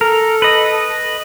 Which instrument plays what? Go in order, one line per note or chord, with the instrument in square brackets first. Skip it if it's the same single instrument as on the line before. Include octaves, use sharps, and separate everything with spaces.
[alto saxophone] A4 [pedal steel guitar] A#4
[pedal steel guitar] B4 D#5